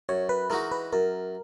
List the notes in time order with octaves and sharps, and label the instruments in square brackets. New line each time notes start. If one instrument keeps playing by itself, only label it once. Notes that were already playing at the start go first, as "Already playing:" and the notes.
[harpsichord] F#2 [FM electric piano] C#5
[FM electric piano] B4
[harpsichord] E3 G#3 D#4 F#4 [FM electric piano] A#4
[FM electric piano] B4
[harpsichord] F#2 [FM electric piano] A#4